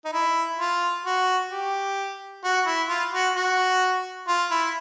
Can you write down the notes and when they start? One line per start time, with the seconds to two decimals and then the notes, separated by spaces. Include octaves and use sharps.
0.05 D#4
0.13 E4
0.59 F4
1.06 F#4
1.51 G4
2.44 F#4
2.66 E4
2.89 F4
3.12 F#4
3.36 F#4
4.28 F4
4.51 E4